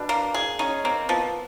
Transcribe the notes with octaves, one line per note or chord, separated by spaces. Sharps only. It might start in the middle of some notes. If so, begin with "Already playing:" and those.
Already playing: B2 D4
A#3
G#4
C#4 D#4
A#3 C4
F3 B3